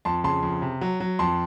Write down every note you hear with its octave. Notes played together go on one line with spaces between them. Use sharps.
F2 A5 C6
C#3 A5 C6
F2
C3
F#3
F#3
F2 A5 C6